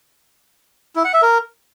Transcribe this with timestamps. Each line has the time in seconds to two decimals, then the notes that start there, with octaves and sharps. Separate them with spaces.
0.96 E4
1.05 F#5
1.13 E5
1.22 A#4